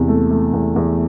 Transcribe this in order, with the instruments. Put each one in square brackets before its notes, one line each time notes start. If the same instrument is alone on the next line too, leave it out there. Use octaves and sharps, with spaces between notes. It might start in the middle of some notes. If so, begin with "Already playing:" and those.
Already playing: [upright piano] E2 C3
A3
A3
E2
E2